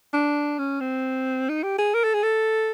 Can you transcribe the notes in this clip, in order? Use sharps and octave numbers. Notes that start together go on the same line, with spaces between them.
D4
C#4
C4
D#4
G4
G#4
A#4
A4
G#4
A4